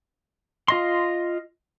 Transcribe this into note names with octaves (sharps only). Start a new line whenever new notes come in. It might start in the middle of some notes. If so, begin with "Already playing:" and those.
F4 D#5 C6